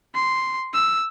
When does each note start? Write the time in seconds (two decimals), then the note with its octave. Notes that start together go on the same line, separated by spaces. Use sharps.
0.14 C6
0.74 E6